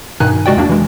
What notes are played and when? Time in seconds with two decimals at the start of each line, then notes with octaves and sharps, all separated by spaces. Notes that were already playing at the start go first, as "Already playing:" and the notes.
0.20 G2 B2 D#3 D#4 G#5 F#6
0.46 C3 G#3 F#4 D5 G5
0.57 E2 A#3 D4
0.69 E3 G#3